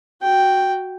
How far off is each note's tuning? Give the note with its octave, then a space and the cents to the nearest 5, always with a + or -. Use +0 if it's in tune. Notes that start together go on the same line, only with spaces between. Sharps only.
F#4 +0 G5 +0